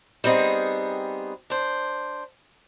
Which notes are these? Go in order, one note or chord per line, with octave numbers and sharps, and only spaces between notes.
G3 B3 C4 D#4 G#4
D4 C5